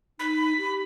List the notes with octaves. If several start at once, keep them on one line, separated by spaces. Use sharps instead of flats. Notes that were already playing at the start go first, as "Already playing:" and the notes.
D#4 B5
G4